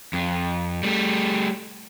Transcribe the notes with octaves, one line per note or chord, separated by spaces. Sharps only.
F2
G3 A3